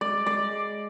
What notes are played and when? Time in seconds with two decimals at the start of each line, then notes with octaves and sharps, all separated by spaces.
0.01 G#3 D5
0.27 G#3 D5